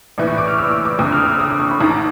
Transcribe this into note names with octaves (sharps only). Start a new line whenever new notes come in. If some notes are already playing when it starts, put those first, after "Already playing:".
A#1 A2 E3
C#6
D6
F6
E6
D6
D6
F#1 F2 D3 D#6
F6
E6
D#6
D6
C#6
B5
A1 G#2 D#3 A#5
A5